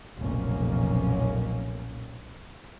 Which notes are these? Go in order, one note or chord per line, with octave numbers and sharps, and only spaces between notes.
F1 B1 A#2 A#3 C#4